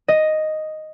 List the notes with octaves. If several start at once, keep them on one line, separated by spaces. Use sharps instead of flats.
D#5